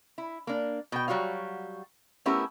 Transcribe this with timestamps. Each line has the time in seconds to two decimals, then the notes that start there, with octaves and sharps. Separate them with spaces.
0.18 E4
0.47 A#3 D4
0.92 B2 G5
1.08 F#3 G3 F#4 C#5 F5
2.26 A3 B3 C#4 E4 G4 A#4